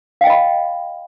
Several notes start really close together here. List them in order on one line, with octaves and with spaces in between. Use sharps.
F5 G5 D#5 B5